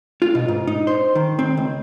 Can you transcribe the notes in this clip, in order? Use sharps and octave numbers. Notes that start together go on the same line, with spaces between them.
F4
B2
G#2
D#4
C5
D#3
C4
C#2